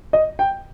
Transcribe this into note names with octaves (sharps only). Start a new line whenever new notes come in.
D#5
G5